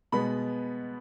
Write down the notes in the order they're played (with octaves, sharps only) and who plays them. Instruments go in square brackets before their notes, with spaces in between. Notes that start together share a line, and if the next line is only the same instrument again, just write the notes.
[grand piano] B2 G#3 B3 B5